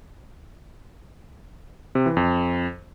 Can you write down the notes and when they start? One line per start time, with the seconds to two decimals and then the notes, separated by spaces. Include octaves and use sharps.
1.95 C3
2.06 E3
2.17 F2